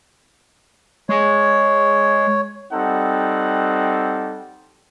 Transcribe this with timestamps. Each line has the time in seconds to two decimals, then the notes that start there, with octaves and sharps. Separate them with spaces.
1.09 G#3 C#5
2.72 G3 C4 D#4 A4 F#5